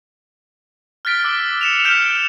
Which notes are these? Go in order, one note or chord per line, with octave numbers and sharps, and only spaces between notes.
F6 F#6 A6 B6 D7 G7
D6 E6 F#6 A6
C#7 E7 F7
F6 G6 B6 D7 E7